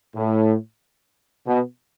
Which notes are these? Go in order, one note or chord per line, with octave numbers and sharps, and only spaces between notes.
A2
B2